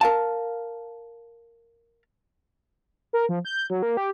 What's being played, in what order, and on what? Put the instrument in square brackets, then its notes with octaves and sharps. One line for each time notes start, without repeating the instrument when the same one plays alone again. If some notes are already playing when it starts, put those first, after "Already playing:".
[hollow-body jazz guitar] A#4 F5 A5
[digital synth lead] A#4
F3
G6
F#3
A#3
G4